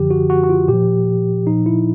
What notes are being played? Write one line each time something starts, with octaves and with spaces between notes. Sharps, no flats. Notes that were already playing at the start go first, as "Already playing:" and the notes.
Already playing: F#2 D3 F3 G4
F#4
F#4
F#4
F4
A#2 G4
F3
A#2 F3 D#4
E4